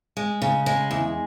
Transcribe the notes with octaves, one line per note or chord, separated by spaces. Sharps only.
G#3
C#3
G#3
E2